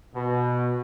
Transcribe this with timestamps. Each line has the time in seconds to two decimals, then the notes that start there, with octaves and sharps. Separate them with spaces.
0.15 B2